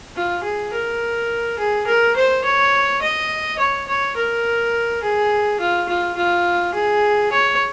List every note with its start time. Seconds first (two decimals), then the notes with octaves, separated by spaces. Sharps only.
0.16 F4
0.43 G#4
0.73 A#4
1.58 G#4
1.87 A#4
2.16 C5
2.44 C#5
3.02 D#5
3.58 C#5
3.88 C#5
4.16 A#4
5.03 G#4
5.60 F4
5.89 F4
6.17 F4
6.74 G#4
7.32 C#5